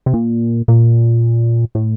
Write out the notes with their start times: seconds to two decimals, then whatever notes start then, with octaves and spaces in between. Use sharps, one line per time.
0.06 C3
0.14 A#2
0.68 A#2
1.75 A2